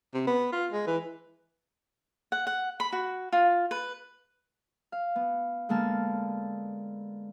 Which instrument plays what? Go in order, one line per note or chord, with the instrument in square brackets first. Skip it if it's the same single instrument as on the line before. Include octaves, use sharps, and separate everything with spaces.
[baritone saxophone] C3
B3
F4
G#3
E3
[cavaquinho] F#5
F#5
B5
F#4
F4
B4
[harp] F5
B3
D3 G#3 A#3 B3 A5 F6